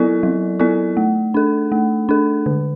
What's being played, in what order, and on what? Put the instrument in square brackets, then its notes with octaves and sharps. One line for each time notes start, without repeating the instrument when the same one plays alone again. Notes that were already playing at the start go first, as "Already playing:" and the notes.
Already playing: [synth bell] F#3 B3 E4 A4 D5
F#3
B3 E4 A4 D5
A3
D4 A4
A3
D4 A4
D3